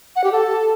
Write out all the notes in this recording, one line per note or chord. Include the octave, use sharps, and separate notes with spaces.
F#5
G4
A4